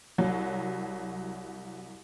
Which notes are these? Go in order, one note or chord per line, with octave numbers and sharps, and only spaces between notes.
C2 F#3